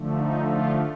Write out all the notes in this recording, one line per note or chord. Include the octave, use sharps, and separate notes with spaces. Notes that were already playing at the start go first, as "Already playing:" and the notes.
Already playing: D3 F3 A3
D#4
F4